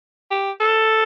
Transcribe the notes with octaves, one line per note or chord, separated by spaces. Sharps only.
G4
A4